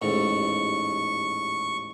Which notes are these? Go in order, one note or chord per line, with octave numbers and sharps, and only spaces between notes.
A1 D#2 G#2 C#6